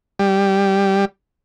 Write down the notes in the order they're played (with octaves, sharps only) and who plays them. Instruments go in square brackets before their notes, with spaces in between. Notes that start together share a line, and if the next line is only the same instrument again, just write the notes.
[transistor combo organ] G3